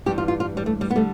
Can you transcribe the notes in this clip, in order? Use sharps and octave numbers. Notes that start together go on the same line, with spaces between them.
G2 E3 G3 G4
F4
F4
F4
G3
A3
G3
B3
D3 G3 A3